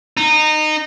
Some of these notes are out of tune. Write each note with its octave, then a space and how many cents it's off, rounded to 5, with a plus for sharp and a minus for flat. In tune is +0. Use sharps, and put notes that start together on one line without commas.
D#4 -20